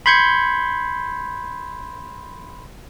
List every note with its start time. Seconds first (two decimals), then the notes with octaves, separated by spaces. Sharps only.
0.06 B5 C6 G6 G#6 C#7